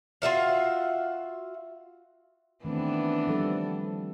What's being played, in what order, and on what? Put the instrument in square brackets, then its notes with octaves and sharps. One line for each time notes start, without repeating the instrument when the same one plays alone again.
[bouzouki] F4 F#4 E5 F5
[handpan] D#3 A3 C4 [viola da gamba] E3 B3 D4
[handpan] F3 G3 A4